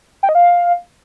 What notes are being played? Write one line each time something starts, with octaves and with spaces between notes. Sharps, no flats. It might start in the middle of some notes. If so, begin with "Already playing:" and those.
G5
D#5
F5